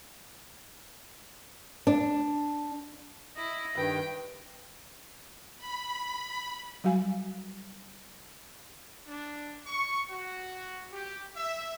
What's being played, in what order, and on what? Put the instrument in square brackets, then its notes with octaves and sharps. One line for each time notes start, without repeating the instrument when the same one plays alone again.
[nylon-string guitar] D4
[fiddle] E4 [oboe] D#5
[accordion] G2 D#3 [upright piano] B4 [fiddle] G5
[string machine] B5
[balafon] F#3 G3 F#4 F5 G#5
[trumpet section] D4
C#6
F#4
G4
E5